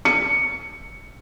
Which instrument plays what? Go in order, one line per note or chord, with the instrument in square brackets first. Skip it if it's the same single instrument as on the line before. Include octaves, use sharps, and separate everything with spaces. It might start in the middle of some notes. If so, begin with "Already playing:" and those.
[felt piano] C#7